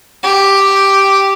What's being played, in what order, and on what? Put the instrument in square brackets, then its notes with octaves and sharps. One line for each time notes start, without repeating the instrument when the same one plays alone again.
[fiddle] G4